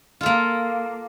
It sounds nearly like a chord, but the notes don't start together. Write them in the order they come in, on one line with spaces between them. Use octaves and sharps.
F4 A4 A#3